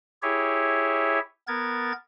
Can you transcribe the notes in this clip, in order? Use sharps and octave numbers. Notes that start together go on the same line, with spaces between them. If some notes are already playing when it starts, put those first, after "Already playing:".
E4 G4 G#4 C#5 E5
B3 A#4 G#6 A6